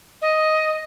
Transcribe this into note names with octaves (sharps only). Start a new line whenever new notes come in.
D#5